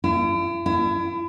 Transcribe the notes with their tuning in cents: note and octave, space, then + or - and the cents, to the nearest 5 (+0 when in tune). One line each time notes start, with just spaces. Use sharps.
E4 +45
E4 +35